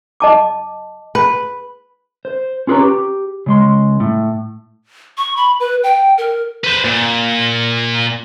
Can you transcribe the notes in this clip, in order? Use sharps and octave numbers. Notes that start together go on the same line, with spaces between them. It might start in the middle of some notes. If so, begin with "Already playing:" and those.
D#5 A5 D6
B4
C5
C#4 F4 G#4 B4 C#5 A#5
G4
C#3 G#3 C6
A2
C#6
B5
B4
G5
A#4
B4 C5
A#2